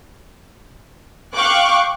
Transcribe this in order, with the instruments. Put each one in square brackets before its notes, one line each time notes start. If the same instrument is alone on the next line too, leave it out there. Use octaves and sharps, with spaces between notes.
[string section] F5 G5 C#6 D6 F#6 G6